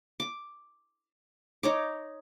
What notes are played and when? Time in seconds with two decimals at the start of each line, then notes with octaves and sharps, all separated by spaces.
0.20 D6
1.63 D#4 C#5 D6